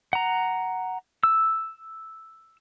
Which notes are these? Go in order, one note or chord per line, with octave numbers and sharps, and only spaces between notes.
F#5 A#5
E6